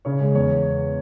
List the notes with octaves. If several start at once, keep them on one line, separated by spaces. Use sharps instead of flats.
C#3 C#5
G#3
E2 C#5